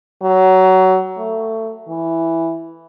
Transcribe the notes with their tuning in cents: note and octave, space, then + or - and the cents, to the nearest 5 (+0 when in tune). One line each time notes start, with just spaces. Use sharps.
F#3 +20
A3 +20
E3 +0